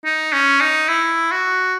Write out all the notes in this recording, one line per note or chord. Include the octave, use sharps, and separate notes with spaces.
D#4
C#4
D#4
E4
F#4